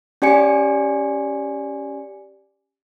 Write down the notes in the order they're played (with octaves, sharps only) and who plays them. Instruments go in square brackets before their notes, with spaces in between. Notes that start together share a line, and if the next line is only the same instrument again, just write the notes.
[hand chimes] C#4 G4 D5 G#5 C#7